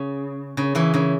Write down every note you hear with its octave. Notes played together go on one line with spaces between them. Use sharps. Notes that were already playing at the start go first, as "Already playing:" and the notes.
Already playing: C#3
C#3
C#3 E3
C#3 E3